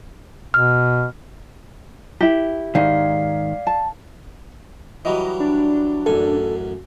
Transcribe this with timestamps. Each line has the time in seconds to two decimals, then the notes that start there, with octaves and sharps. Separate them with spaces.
0.54 B2 F6
2.21 E4 G4
2.75 G#2 D#3 D5 F5 C7
3.67 A5
5.05 E3 F#3 G3 D#5
5.40 D4
6.06 A1 F#2 A4 G#5